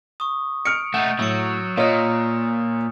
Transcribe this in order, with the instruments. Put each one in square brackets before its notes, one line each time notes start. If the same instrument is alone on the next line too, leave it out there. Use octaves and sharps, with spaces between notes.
[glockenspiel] C#6 D#6
[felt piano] F6 C#7 [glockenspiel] D7
[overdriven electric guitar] A3 D#4 [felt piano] F#5 [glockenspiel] G6 A6
[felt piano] A2 [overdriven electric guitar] F#3 [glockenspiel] E6 C#7
[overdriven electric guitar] A#2 [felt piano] F4 C#5 D#5 [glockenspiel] D#6 F6